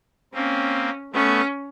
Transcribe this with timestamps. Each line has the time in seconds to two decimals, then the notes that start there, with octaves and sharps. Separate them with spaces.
0.33 A#3 C4 C#4
1.13 A3 B3 C#4